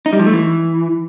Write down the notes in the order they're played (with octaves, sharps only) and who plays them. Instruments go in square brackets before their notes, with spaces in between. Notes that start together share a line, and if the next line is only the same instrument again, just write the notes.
[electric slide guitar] D#4
G3
F3
A3
E3